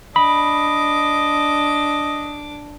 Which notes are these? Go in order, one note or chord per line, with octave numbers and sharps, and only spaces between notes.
D4 D#5 B5 D6